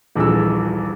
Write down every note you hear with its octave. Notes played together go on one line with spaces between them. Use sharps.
D#1 A#1 E3 G#4 E6